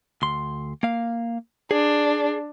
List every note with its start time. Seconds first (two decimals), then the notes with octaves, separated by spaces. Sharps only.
0.22 D2 C6
0.83 A#3 F5
1.71 D4 G#4